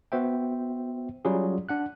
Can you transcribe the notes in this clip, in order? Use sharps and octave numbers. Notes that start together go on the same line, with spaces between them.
B3 F#4 C5 E5 G5
F#3 G3 C#4 F4 G#4
D4 F#5 F#6